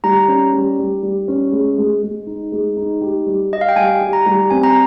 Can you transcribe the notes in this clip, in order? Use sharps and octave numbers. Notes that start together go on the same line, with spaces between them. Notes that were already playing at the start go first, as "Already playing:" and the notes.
G3 A#5
C#4
G3
G3
G3
C#4
G#3
G#3
G#3
D#4
G#3
D#4
G4
G3
G4 D#5
F5
G5
G3 G#5
G4
A#5
G3
C4 G#5
A#5